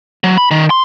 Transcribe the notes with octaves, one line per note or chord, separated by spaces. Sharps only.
F#3
B5
D#3
C6